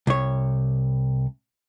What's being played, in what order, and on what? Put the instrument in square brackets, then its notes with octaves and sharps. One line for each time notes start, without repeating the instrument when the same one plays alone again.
[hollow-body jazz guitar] C2 C#5